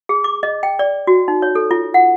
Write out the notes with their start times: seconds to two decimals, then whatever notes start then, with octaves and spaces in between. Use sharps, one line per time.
0.09 G#4
0.24 D6
0.43 D#5
0.63 G5
0.79 D5
1.07 F#4
1.28 D#4
1.42 C#5
1.55 A4
1.71 F4
1.94 F#5